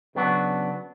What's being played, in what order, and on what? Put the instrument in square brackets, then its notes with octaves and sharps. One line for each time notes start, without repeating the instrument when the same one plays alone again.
[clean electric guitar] C#3 F#3 B3 D4 F#4